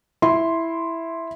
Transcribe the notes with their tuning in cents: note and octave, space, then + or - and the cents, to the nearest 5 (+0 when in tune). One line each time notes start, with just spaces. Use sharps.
E4 +0 C6 +0